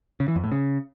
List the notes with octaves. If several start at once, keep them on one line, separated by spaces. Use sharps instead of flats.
C#3
E3
F2
A2
C#3